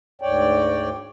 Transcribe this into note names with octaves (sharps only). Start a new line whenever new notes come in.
D2 G#2 C#5 D5 G5